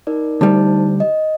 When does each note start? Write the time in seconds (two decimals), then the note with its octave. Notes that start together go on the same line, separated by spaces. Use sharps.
0.07 D#4 A#4 D5
0.41 D2 G3 D#4 C5 A5
1.00 D#5